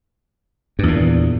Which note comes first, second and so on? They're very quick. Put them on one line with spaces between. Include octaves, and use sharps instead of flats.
G2 E2 A#2